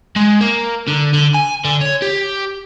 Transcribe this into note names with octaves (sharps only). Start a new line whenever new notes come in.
G#3
A#3
D3
D3
G#5
D3
C#5
G4